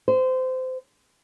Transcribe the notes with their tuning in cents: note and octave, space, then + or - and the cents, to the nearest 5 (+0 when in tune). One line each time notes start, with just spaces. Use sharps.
C5 -25